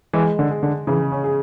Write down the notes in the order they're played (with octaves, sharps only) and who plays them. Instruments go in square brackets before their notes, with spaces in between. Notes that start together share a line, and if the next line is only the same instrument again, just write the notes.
[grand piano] E3 [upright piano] G#3
[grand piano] D3
[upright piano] G#4
[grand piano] D3
[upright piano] C#3 [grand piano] E3
[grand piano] C#4
[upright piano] G#4